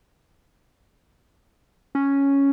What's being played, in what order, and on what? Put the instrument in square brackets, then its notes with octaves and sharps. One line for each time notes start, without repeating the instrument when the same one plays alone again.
[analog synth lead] C#4